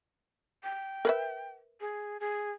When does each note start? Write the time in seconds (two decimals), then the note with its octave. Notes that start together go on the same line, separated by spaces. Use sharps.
0.63 G5
1.05 A#4 B4 E5
1.81 G#4
2.20 G#4